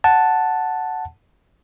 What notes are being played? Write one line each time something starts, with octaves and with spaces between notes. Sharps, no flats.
F#5 A5